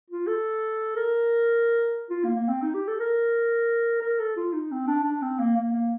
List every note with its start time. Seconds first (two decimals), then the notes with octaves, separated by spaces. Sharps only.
0.10 F4
0.27 A4
0.96 A#4
2.10 F4
2.24 A#3
2.36 A#3
2.49 C4
2.62 D#4
2.74 G4
2.88 A4
3.00 A#4
4.02 A#4
4.20 A4
4.37 F4
4.53 D#4
4.71 C4
4.88 D4
5.04 D4
5.22 C4
5.39 A#3
5.56 A#3
5.73 A#3